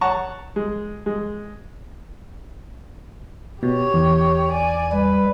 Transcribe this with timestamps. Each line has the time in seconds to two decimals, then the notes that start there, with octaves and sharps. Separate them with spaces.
0.01 C#5 F#5 A5 A#5 C#6
0.56 G#3
1.06 G#3
3.63 B2 G4 C#5
3.94 E2
4.52 D5 G#5
4.92 G3 B4